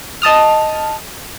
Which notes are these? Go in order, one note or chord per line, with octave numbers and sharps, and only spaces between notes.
D#5 A5 D#6 F6